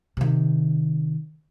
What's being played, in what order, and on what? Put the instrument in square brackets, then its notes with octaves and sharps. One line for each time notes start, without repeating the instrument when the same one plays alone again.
[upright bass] C3 D#3